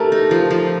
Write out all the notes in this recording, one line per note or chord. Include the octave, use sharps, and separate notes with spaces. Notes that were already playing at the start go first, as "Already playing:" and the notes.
Already playing: A3 G4 A4 A#4
D#4
F3
F3